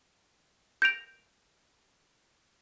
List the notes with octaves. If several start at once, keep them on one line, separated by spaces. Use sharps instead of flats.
G6 A#6 D7 F7